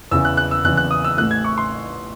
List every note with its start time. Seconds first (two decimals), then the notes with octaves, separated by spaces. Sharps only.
0.11 E2 C#3 E3 E6
0.25 F#6
0.37 F#6
0.51 E6
0.64 E2 C#3 E3 F#6
0.77 F#6
0.91 D#6
1.04 E6
1.17 A1 A2 E3 A3 F#6
1.31 G#6
1.44 C#6
1.58 C6